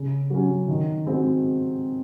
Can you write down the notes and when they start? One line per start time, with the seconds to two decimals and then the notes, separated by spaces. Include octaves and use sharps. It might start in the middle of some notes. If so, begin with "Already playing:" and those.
Already playing: C#3
0.30 F#3 C#4
0.68 D#3
1.06 G#3 C4 F#4